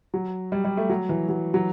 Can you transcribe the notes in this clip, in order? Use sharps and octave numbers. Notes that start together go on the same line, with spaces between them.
F#3
G3
G3
A3
F#3
E3
F#3
F#3